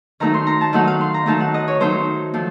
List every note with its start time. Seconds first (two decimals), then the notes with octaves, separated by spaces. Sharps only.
0.20 D#3 F#3 A3 D#4 A#5
0.34 C6
0.47 A#5
0.61 A5
0.73 D#3 F#3 A3 D#4 F#5
0.87 F5
1.01 C6
1.14 A#5
1.26 D#3 F#3 A3 D#4 A5
1.40 F#5
1.54 D#5
1.68 C#5
1.80 D#3 F#3 A3 D#4 C5
2.34 F3 A3